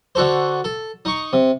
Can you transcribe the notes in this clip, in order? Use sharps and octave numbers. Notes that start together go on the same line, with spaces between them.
D3 F#4 A4 C5
A4
D#4 C#6
C3